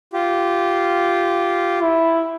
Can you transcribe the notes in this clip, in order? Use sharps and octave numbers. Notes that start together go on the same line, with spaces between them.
F4 G4
E4